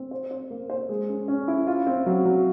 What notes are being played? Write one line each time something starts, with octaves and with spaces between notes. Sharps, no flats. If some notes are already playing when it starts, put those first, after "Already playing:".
Already playing: C4
C5
C5
A#3
C5
G#3
C#4
C#4
E4
F4
C4
F#3
F#3